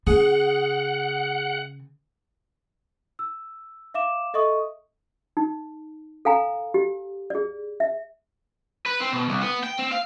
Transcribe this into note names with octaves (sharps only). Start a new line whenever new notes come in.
C#3 G#4 F#5
E6
E5 F5 D6 E7
A4 D#5 E5 C#6 D#6
D#4
A4 F5 G#5 A#5
G4
G#4 D5
E5
B4
C4
B2
C2
B3
G5
C4
F5